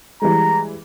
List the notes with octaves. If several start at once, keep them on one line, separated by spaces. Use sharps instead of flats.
E3 G3 G#3 A#5